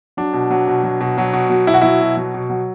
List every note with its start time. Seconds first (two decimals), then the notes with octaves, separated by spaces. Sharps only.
0.17 F#3 D4
0.33 B2
0.50 F#3
0.68 B2
0.84 F#3
1.01 B2
1.18 F#3
1.34 B2
1.50 F#3
1.67 B2 E4
1.74 F#4
1.81 F#3 E4
2.01 B2
2.17 F#3
2.34 B2
2.50 F#3